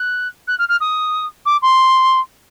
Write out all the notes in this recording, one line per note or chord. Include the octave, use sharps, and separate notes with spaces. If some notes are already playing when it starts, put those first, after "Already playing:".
Already playing: F#6
F#6
F6
F6
D#6
D6
C6